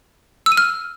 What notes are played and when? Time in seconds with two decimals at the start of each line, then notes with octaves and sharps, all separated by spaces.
0.46 E6
0.52 D#7
0.57 F6